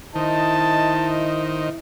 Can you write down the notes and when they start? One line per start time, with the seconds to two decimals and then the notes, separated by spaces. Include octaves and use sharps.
0.15 D#3 E4 C5 D#5 A5